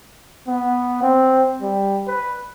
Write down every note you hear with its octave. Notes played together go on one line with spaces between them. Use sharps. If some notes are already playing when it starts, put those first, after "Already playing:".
B3
C4
G3
B4